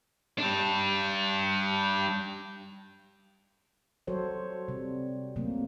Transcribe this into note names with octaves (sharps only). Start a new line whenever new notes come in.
G3 D4
F#3 G3 F#4 A4 C5 C#5
C3 G3
C3 F#3 A3 A#3